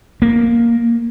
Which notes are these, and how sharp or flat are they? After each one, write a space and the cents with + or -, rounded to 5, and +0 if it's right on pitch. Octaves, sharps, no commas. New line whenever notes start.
A#3 +0